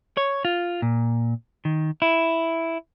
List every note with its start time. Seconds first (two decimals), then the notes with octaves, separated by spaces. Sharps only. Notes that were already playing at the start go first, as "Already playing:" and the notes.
0.17 C#5
0.45 F4
0.82 A#2
1.65 D#3
2.02 E4